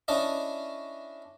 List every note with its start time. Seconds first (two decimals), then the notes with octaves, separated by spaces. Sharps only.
0.08 C#4 D4 E4 D5 D#5